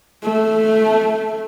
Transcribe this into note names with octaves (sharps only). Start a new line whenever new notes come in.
A3